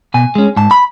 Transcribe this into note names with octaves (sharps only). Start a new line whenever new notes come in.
B2 G#5
G#3 C#4
G#2 A5
B5